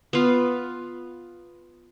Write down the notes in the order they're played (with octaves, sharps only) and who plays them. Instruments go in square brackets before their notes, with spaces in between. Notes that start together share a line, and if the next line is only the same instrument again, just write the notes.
[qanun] B3 F4